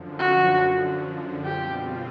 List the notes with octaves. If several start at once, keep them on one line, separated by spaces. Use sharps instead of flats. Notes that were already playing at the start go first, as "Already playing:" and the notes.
Already playing: F#2 D3 F3
F#4
B2 G3 C4 F4 G4